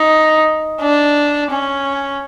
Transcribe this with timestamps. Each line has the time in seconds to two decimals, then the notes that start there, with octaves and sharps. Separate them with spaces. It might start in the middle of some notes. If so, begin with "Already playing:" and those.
Already playing: D#4
0.81 D4
1.51 C#4